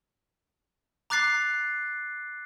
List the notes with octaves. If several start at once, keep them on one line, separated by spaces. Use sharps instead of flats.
A#5 D6 F#6 A6 C7